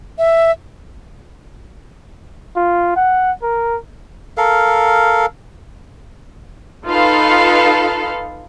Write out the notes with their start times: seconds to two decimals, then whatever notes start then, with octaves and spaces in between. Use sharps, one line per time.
0.18 E5
2.56 F4
2.96 F#5
3.42 A#4
4.37 A4 A#4 F5
6.87 D#4 F4 A4 B4 F5